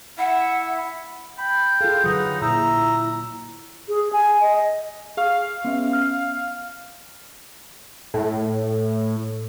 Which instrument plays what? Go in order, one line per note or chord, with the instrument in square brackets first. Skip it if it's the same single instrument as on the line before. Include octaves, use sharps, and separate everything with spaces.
[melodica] E4 [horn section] E5 [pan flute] F#5
[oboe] G5 [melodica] B5
[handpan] F4 A4 [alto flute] G#4 [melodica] F5
[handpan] D3 F#3 [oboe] D#4 [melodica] B4 F#5
[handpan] A#2 [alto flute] E4 [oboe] E5 [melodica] A#5
[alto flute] G#4
G#5
D#5
[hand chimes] G#4 C#6 F6 [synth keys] F5
[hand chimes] B3 C#4 E5
F6
[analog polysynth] A2